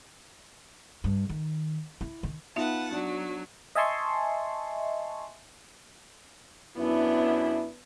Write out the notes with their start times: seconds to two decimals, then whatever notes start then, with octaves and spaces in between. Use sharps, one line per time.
1.04 G2
1.29 D#3
2.01 E4
2.23 D#3
2.56 B3 D#4 F4 B4 E5 F#5 A5
2.92 F#3 D4
3.75 D#5 E5 G#5 A5 C6 C#6
6.77 F#2 B3 D4 E4